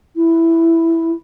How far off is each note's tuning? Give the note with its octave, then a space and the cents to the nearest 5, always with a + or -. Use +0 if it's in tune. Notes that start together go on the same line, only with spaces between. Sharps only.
E4 +5